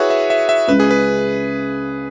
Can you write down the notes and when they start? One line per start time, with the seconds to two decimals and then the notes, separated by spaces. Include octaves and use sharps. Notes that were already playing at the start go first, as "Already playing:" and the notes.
Already playing: E4 F#4 G#4 B4 C#5 E5
0.10 E5
0.30 E5
0.49 E5
0.68 C#2 C#3 G#3 B4
0.80 G#4
0.91 B4